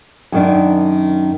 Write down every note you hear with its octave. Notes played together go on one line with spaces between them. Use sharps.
F#2 D#3 D4